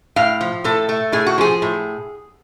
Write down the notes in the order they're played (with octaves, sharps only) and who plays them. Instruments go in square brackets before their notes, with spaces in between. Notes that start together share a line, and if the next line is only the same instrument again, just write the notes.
[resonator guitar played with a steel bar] A2 F5
F3
A2 A4
A3
A2 G#4
F#4
F3 G#4
A2